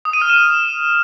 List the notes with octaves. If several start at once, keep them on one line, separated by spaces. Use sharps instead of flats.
D#6
D#7
F6
E7